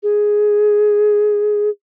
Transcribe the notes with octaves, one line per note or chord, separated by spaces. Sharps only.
G#4